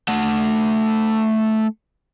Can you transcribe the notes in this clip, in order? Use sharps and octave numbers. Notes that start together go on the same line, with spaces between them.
A3 F#5